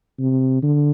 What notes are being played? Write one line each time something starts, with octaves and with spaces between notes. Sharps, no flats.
C3
D3